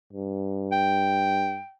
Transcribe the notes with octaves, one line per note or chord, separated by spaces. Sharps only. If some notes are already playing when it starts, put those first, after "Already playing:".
G2
G5